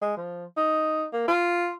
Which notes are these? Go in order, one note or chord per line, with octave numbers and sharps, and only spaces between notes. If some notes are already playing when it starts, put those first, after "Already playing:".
G#3
F3
D#4
A#3
F4